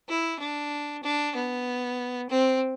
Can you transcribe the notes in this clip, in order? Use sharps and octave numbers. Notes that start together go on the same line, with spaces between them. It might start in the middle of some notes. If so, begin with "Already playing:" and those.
E4
D4
D4
B3
C4